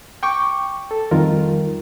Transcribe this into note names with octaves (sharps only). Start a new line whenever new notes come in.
G5 C#6 D6
A4
F2 D#3 G3 F4 A#4